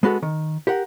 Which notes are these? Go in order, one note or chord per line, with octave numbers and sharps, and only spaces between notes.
G#3 B3 F#4 A4
D#3
G4 A#4 F#5